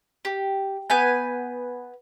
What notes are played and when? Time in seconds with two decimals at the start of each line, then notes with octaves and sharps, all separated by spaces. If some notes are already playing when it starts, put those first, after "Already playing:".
0.25 G4
0.90 B3 B4 G#5 G6